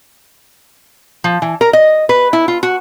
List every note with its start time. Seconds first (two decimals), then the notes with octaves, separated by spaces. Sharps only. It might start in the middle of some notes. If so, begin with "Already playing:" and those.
1.24 F3
1.42 E3
1.61 A#4
1.73 D#5
2.09 B4
2.33 E4
2.48 F4
2.63 F#4